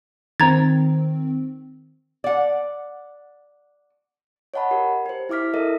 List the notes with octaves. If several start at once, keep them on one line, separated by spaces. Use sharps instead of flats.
D#3 C4 A#5 G#6 A6
D5 F#5
C#5 D#5 F#5 A5 B5
G4 A#4
G4 C5
E4 E5 D6 F6 B6
E4 A4 A#4 D#5 E5